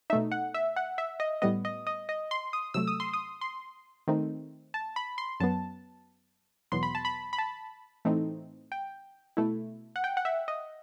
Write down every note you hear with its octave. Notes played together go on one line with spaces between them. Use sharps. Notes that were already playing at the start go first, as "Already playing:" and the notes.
B2 A3 D#4 E5
F#5
E5
F#5
E5
D#5
A2 G3 B3 D#5
D#5
D#5
D#5
C6
D#6
C3 F#3 A3 E6
D#6
C6
D#6
C6
D#3 A3 C4 D#4
A5
B5
C6
F#2 F#3 B3 A5
E2 B2 F#3 B3 C6
B5
A5
B5
B5
A5
A2 E3 A3 C4 D#4
G5
B2 A3 E4
F#5
G5
F#5
E5
D#5